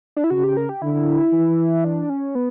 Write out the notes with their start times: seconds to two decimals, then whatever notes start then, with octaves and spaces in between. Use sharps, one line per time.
0.17 D4
0.24 E4
0.30 C#3 F#4
0.44 G4
0.57 A#4
0.69 G4
0.82 D3 E4
1.33 E3
1.84 D4
2.10 C#4
2.35 B3